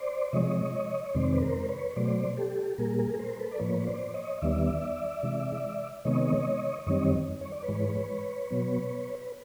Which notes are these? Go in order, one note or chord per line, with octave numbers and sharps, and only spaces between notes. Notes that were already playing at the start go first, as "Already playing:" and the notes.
Already playing: C5 D5
C3 F3 G#3 C#5 D#5
C#5
F2 C3 D#3 G#3 C4 C5 D5
B4
A#4 C5
B4 C#5
B2 F#3 A3 C5 D5
G4 A4
A#2 G3 A#3 G#4 A#4
G#4 A#4
A#4 C5
A4 B4
D5
A2 F3 A#3 B4 C#5
C5 D5
C#5 D#5
D#2 D#3 G3 B3 D5 E5
C3 E3 G#3
C3 D#3 G#3 B3 C#5 D#5
F#2 D#3 G3 C4 C#5 D#5
C#5
D5
B4 C#5
G#2 E3 G#3
B2 F#3 B3
B4